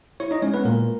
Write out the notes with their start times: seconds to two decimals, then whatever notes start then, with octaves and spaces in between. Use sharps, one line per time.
0.20 E4 C#5 C#6
0.31 D#4 D#5
0.42 G#3 C#4 C#5
0.54 B3 B4
0.65 A#2 A#3 A#4